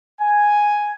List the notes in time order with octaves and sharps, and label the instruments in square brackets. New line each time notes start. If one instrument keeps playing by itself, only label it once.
[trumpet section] G#5